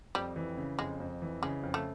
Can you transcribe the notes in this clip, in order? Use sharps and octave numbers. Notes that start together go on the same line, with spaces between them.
F2 G3
E3
C#3
F2 G#3
F2
E3
C#3 G#3
F2
A3